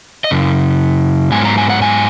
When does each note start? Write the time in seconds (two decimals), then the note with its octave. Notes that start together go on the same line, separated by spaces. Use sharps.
0.24 D#5
0.31 F#2 C#3
1.31 G#2 F#3 B3 G#5
1.45 A#5
1.58 G#5
1.69 F#5
1.82 G#5